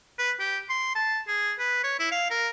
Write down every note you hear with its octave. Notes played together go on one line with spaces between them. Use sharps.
B4
G4
C6
A5
G#4
B4
C#5
E4
F5
A#4